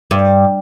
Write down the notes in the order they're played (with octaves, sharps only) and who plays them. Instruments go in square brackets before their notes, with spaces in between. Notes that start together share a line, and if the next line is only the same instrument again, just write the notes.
[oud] G2